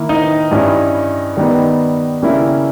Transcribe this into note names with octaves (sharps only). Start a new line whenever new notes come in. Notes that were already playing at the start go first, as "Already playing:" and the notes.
Already playing: D#3 A#3 E4
D#4 D#5
G2 G3 C#4 E4
D#3 G3 B3 D#4
C#3 G3 A#3 C#4 E4